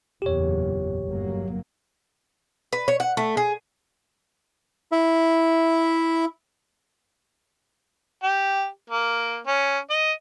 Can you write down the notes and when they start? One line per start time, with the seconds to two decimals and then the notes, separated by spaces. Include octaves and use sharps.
0.22 F#1 E2 A#2 G4 C#5
1.07 G1 F#3 A#3
2.73 B4
2.88 C#5
3.00 F#5
3.17 A3
3.37 G#4
4.92 E4 E5
8.23 G4
8.89 A#3
9.47 C#4
9.90 D#5